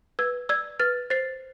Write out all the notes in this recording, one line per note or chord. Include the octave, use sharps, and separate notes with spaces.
B4 E6 G#6
D5 E6 G#6
B4 F6 A6
C5 A6 C7